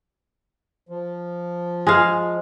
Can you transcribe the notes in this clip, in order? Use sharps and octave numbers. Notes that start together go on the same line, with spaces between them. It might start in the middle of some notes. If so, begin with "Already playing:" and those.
F3
G#3 F5